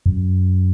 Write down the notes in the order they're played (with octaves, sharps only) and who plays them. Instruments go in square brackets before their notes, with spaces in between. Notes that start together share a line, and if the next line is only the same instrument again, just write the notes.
[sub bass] F#2